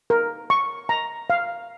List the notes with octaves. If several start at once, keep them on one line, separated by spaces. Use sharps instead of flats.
A#4
C#6
A#5
F5